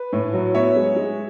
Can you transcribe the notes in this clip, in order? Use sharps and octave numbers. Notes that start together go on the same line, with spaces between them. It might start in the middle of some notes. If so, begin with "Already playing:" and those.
Already playing: B4
A2
F#3
B3 C#5 E5
G#3
G#3